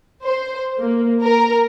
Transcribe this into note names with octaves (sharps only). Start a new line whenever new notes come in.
C5
A#3
A#4